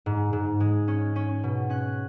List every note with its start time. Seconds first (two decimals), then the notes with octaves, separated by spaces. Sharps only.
0.06 G#2
0.33 G#2
0.60 G#3
0.88 C#4
1.16 C#4
1.43 B2
1.70 C#4 F#6